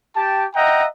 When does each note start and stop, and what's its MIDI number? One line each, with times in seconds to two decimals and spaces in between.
0.16 0.46 67
0.16 0.46 79
0.16 0.46 81
0.55 0.85 75
0.55 0.85 76
0.55 0.85 78
0.55 0.85 79
0.55 0.85 82